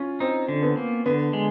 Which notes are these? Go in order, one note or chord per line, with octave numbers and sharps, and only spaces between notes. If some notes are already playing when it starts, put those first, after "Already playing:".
Already playing: C#4 F4
C4 D#4
D3
B3
A#3
D3 B3
G#3